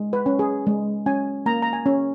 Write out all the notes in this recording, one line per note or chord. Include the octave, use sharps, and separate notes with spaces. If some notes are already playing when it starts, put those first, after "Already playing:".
Already playing: G#3
B4
C#4
G#4
G#3
C#4 G#5
A#3 A#5
A#5
G#5
C#4